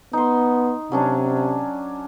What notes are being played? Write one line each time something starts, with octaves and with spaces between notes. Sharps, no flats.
B3 D#4 C6
C3 F#3 C#4 D4